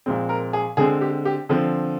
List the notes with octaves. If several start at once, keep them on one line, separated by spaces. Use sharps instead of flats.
A#2 F3 G#3 C4
A#4
G#4
D3 G#3 C4 G#4
G4
G4
D3 F3 C4